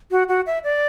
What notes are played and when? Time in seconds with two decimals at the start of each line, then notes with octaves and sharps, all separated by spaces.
0.11 F#4
0.29 F#4
0.46 E5
0.64 D5